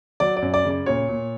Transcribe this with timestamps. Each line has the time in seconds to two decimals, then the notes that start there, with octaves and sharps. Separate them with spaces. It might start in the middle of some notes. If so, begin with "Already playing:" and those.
0.20 F#3 D5
0.37 D5
0.42 F#2
0.54 D5
0.65 C#3
0.70 D5
0.86 A#2 C#5
1.09 A#2